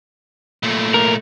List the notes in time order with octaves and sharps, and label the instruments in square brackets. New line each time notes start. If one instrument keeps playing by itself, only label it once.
[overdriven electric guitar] A#2 A3
[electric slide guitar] A#4